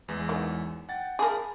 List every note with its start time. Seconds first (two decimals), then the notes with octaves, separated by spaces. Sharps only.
0.08 E2 E3 G#3
0.29 D#3 F#3
0.89 F#5 G5 A6
1.19 G#4 A#4 A5 B5